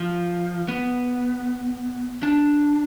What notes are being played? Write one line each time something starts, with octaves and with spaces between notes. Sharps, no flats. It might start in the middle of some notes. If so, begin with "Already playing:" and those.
Already playing: F3
B3
D4